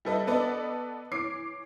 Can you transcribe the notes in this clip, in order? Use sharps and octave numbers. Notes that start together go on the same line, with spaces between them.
G3 E4 A4 B4 D#5 E5
B3 A4 B4 D5 D#5
E3 C#5 D6 C7 D7